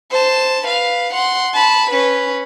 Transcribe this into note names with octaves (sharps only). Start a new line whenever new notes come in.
C5 A5
B4 F5
F#5 C6
A5 B5
C#4 B4